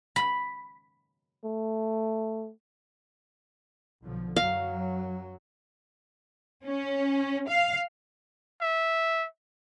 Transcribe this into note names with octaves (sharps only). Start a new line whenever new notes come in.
B5
A3
B1 D3 F3
F#2 F#3 F5
C#4
F5
E5